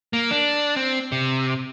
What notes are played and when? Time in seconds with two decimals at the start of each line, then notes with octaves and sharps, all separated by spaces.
0.13 A#3
0.31 D4
0.76 C4
1.12 C3